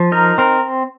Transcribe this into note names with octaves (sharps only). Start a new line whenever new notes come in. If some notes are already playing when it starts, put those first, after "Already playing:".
Already playing: F3
D#4 A#4
C4 A#4